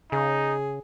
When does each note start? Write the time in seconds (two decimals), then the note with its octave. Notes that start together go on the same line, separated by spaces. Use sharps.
0.12 C#3 D#4 G#4